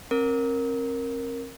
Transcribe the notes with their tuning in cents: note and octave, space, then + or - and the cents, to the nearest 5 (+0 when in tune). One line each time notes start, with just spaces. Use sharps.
C4 +40 A#4 +0